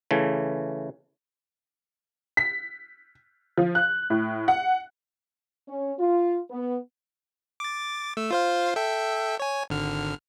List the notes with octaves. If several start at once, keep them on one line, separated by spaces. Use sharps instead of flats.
C#3 E3 A3
B6
F3
F#6
A2
F#5
C#4
F4
B3
D6 A6
A3 E6
F4 C5 F5
A4 E5 G5
C#5 G#5
G#1 D3 F6